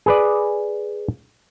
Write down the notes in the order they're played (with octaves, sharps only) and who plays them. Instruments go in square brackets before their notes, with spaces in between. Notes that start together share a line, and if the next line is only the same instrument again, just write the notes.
[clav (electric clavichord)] G#4 B4 D5